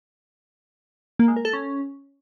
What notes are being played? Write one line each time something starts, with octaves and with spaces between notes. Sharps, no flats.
A#3
G#3
A#4
A4
C#4